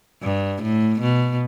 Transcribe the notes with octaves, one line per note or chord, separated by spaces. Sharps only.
G2
A2
B2